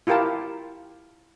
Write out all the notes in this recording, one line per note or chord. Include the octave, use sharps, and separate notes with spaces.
E4 F4 G4 A#4 G5 A5